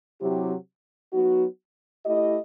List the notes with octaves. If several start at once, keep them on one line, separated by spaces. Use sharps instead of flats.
C3 F#3 C4 E4 G4
F#3 B3 D#4 F#4
A3 E4 G4 D#5